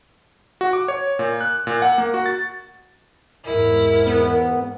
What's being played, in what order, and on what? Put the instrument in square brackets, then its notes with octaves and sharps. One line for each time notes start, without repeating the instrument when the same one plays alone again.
[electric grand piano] F#4
D6
C#5
A#2
F#6
A#2
F#5
A#3
F#4
A6
[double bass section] E2 G#2 [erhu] E4 [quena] A#4
[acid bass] B3